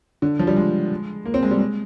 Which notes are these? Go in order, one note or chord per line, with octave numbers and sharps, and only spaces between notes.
D3
F3
G3
G#3
A#3
C4
G#3
G3
G#3